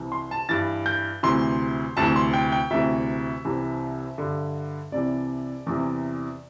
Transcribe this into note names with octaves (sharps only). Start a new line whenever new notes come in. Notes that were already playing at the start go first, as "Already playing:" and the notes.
Already playing: C2 C3 E3
C6
A5
G2 E3 A6
G6
D2 C3 E3 C6
D2 C3 E3 A5
C6
G5
G5
D2 C3 E3 E5
C2 C3 E3
G2 D3
C2 C3 E3 D5
E2 C3 E3